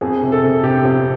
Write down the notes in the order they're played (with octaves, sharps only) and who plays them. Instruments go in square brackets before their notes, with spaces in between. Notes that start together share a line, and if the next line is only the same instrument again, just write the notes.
[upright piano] F2 G#4
C3
A4
C3
C3 G4
F2